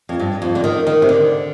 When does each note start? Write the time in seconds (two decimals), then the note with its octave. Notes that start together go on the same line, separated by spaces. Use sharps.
0.09 F2
0.19 G2
0.42 F2
0.55 D3
0.64 D#3
0.87 D#3
1.02 C3
1.09 D3